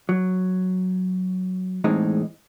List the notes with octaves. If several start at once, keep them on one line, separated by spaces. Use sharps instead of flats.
F#3
E2 A2 G#3 C4 D#4